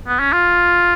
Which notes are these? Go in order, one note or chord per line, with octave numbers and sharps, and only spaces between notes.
B3
C#4
F4